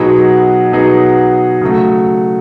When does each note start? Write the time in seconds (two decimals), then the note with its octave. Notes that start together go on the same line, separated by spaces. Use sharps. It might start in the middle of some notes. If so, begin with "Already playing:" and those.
Already playing: B2 F#3 B3 D#4 G#4
0.72 B2 F#3 B3 D#4 G#4
1.61 C#3 F#3 A3